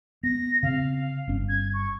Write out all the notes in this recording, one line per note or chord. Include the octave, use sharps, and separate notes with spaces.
B3 A#6
C#3 C4 F5
G1 C#4
G#6
C#6